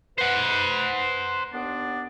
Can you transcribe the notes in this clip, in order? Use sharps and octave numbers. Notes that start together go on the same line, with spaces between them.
B4 C5 F#5
D#2 B3 D4